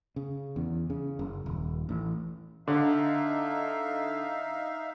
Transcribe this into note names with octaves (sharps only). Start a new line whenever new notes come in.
C#3
E2
C#3
F#1
D#1
A1
D3 D#4 E5 F5